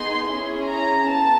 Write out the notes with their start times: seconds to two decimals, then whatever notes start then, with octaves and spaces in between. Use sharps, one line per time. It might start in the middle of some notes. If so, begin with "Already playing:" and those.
Already playing: B3 D#4 G#4 C6
0.30 C#4 E4 G#4
0.69 A#5
1.09 B3 A5